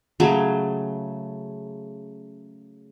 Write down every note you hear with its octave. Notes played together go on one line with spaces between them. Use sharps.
C#3 F#3 A3